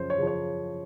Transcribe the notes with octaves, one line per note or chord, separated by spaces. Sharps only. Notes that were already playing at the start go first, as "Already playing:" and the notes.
Already playing: F#2 C#3 F3 C5
C#5
C#3 F3
C#5